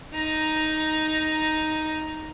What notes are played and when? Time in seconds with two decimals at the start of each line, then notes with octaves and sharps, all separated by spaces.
0.14 D#4 A#5